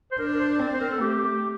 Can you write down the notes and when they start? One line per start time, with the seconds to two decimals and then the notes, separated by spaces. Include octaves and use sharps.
0.12 C5
0.19 D4 A#4
0.34 A#4
0.39 C5
0.60 C4 D5
0.73 C5
0.80 A#4
0.91 A4
1.01 A3 G4